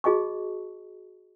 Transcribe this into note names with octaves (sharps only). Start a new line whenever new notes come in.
F#4 G#4 D#5 A5 C#6